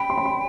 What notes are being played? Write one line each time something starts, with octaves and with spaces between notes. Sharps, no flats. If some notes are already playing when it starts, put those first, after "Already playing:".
Already playing: G5 B5
C6
B5
C6